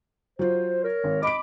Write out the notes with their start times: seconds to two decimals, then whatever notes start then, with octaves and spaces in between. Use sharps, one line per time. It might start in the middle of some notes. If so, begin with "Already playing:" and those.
0.39 F#3 F4 C5
0.84 A#4 C#5
1.04 G#1
1.23 D#5 B5 D6 D7